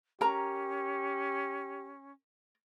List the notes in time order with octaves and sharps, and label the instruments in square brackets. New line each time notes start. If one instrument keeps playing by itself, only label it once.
[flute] C#4 [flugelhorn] G4 [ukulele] A#4 A#5